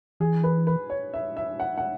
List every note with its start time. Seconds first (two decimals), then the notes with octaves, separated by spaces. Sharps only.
0.20 E3 G#4
0.44 B4
0.67 B4
0.90 C#5
1.14 E5
1.37 E5
1.60 F#5
1.77 F#5